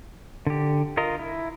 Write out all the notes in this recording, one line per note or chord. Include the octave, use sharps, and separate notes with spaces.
D3 G4
F4 A#4 D#5
E4